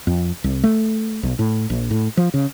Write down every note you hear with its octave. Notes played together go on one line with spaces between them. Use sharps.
F2
C2
A3
B1
A2
A#1
A2
F3
C#3